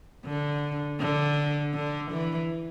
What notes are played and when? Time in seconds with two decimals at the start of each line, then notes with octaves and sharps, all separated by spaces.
0.25 D3
1.00 D3
1.74 D3
2.11 E3